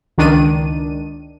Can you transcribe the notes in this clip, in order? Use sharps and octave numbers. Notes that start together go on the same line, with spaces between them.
C#2 D#3 D4 D#7